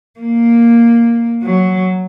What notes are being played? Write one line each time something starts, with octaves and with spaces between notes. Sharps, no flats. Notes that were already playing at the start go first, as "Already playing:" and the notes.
A#3
F#3